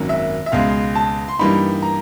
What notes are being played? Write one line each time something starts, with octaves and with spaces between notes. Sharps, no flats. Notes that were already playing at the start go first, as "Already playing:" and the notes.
Already playing: G#1 F#2 D#3 F#3 A#3
E5
E5
C#2 B2 G#3 F5
A5
C6
G2 E3 G3 A#3 D#4 B5
A#5